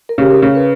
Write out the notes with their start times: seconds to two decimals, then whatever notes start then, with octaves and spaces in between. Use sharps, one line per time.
0.09 A#4
0.18 C#3 G4
0.31 A#4
0.42 C#3 A#4
0.55 B4